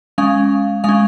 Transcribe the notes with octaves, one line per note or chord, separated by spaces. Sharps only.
G#3 C#4 F5
G#3 C#4 F5